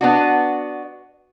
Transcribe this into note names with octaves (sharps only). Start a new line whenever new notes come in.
B3 D4 F#4